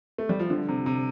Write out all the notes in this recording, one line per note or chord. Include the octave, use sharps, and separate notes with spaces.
A3
G3
F3
D3
C3
C3